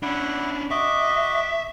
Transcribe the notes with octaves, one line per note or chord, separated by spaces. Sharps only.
C#4 D4 E4 F#5
F#4 D#5 E5 D6